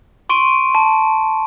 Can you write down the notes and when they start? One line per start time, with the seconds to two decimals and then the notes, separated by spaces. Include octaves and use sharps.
0.29 C6 C#6 D7 D#7
0.75 A5